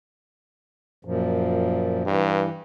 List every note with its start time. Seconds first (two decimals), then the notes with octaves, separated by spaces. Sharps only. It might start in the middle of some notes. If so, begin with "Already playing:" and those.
1.05 F#2 A#2 F3
2.05 G2 E3